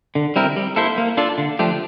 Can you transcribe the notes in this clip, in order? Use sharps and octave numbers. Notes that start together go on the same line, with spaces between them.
D3
G3 C4 E4 A#4
G3
A#3 E4 A4 C5
A#3
D4 F4 A4 D5
D3
F3 A3 D4 G4